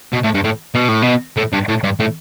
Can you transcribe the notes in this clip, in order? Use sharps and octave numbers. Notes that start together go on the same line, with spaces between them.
B2
A2
G2
A2
B2
A2
B2
A2
G2
A2
G2
A2